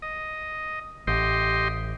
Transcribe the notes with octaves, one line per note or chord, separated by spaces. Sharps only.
D#5
A1 G4 D#5 C6